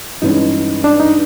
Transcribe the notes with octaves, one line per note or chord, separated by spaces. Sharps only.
G2 E3 G#3 C#4 D#4
D4
D#4